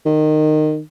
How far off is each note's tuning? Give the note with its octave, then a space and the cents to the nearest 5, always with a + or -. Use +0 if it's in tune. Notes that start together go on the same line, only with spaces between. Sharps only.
D#3 -20